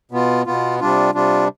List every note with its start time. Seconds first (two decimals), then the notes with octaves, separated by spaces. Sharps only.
0.11 B2 B3 F4
0.46 B2 B3 F4
0.80 C3 G3 D4 F4
1.14 C3 G3 D4 F4